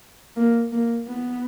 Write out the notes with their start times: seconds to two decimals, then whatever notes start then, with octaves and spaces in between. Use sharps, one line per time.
0.36 A#3
0.72 A#3
1.08 B3